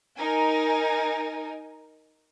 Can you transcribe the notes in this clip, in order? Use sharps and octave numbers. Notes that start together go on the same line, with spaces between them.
D#4 A#4 G#5